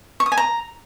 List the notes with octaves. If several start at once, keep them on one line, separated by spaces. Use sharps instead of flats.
C#6
D#6
G#5
A#5